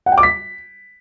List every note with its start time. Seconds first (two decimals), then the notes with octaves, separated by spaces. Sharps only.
0.06 F#5
0.12 G5
0.18 D6
0.23 B6